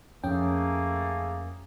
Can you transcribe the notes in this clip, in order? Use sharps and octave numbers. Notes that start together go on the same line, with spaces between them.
F2 A3 A#3 C#4 G#4 G5